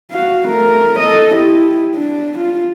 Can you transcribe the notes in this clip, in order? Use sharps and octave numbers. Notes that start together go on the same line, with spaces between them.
F#4 F5
A3 A#4
A4 D#5
E4 G4
D4
F4